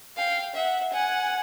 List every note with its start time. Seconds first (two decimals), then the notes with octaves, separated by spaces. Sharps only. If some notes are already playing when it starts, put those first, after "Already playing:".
0.17 F5 G5
0.55 E5 F#5
0.93 F#5 G#5